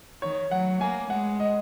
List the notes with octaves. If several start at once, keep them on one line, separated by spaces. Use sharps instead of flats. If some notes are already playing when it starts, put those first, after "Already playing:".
D#3 C#5
F#3 F#5
A#3 G#5
G#3 F#5
D#5